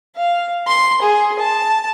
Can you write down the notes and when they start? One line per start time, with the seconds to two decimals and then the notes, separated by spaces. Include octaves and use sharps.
0.16 F5
0.67 C6
1.01 G#4
1.39 A5